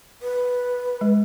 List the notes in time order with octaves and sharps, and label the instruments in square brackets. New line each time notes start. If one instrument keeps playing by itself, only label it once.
[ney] B4
[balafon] G#3